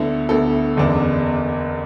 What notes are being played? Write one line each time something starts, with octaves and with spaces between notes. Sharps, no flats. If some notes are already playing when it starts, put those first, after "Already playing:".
Already playing: D2 D3 B3 E4 A4
D2 D3 B3 E4 A4
F#1 E2 D3 B3 D4